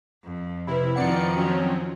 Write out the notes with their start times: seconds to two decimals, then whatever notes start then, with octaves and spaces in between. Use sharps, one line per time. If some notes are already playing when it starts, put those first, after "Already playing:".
0.24 F2
0.67 C3 E4 B4 B5
0.96 F2 D#3 F3 C4 D5 F#5 C#7
1.37 F#3 C4 C#4 F#4